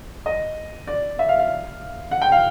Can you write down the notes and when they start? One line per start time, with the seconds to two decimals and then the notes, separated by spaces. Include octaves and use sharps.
0.26 D#5
0.87 D5
1.19 E5
1.29 F5
1.39 F5
2.11 F#5
2.22 G5
2.32 F5